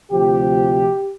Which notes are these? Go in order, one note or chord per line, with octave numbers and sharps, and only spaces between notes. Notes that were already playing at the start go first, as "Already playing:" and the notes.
D2 C3 F3 G4